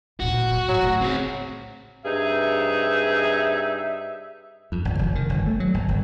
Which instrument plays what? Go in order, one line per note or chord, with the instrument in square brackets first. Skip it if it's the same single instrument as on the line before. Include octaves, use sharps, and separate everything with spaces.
[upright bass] D2 A#2 [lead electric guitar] F#4
[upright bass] G3
[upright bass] A2 [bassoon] F#3
[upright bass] D3 A3
[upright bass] C#3 [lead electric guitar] C4 G#4
[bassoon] G2 [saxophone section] C3 D#4 G#4 [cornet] E5
[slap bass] F2
G#1
F1
D#3
G1
A3
F#3
G#1
G1